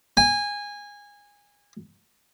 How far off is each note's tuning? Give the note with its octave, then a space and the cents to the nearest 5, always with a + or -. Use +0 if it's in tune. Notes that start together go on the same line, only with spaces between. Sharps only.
G#5 -20